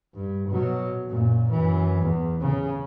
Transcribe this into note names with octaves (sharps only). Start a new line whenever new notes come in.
G2
B2 F#3
F#2 A#2
F#2 E3
E2
C#3